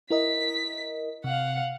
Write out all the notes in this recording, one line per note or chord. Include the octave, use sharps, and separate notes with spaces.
E4 A#4 D#5 B6
C3 F5 F#5